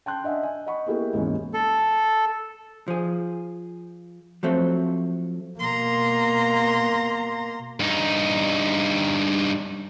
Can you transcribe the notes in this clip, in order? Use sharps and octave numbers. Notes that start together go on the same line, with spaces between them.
G5 A5 C6 F#6 G6
D4 D#5 E5 F#5 G#5
G#5
D#5 F#5 B5 C#6
A#3 B3 E4 G4 G#4 A#4
D#2 G#2 B2 E3 G#3 C#4
A4
F3 G#4
F3 F#3 A3 C4
B2 A#3 A#5 C6
G2 D#4